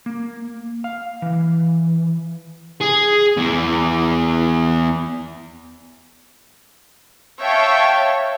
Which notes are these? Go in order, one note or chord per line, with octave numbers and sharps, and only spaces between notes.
A#3
F5
E3
G#4
E2
C#5 E5 F5 G5 A5